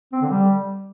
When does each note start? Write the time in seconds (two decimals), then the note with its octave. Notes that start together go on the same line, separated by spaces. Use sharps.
0.12 C4
0.22 D3
0.31 G3